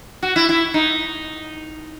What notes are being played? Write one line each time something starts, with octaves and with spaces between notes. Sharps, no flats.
F#4
E4
E4
D#4